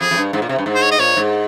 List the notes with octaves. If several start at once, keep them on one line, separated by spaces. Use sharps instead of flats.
F2 G#4
F2
G2
G#2
A#2
C3
G2
G#2
C5
C#5
D#5
A#2 C#5
G#2